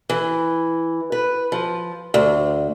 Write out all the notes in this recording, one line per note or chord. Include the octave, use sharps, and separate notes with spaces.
E3
B4
F3
D2